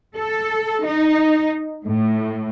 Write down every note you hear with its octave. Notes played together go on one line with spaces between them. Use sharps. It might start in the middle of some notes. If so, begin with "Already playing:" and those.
A4
D#4
A2